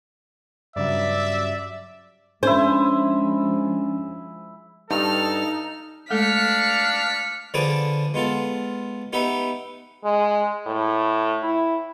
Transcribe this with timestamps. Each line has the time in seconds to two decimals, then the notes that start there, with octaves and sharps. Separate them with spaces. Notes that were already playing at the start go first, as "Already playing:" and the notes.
0.76 G2 C#3 F#3 D5 E5
2.43 F3 G#3 C#4 D4 E4 C5 G#5
4.91 G2 D#4 A4 F6
6.10 G#3 A3 D4 A4 F5 F6 B6 C#7
7.54 D3 F3 G#4 B4 D6 D#6
8.14 G#3 B3 F4 A4
9.13 B3 D#4 G4 B4 E5 B5
10.04 G#3
10.66 A2
11.43 E4